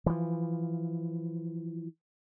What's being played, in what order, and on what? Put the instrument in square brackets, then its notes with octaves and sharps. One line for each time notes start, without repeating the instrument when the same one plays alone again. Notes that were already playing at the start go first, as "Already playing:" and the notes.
[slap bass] E3 F3